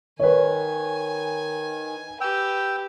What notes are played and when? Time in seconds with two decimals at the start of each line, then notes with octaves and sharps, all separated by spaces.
0.19 D#3 B4 C#5 G#5
2.21 G4 B4 G5 E6